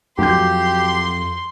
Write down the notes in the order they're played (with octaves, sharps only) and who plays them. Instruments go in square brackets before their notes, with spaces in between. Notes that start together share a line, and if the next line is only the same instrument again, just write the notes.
[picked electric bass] F2 [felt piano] F#3 G6 [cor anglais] G4 [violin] C6